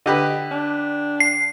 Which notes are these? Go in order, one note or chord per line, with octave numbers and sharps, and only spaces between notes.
D3 G4 B4 D#5
D4
C7